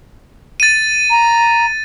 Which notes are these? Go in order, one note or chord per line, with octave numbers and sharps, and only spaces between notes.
A6 D#7
A#5